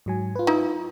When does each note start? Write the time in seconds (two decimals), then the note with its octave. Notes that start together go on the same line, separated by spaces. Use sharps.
0.06 G#2 F#3 G#5
0.36 F4 B4
0.47 D#4 E4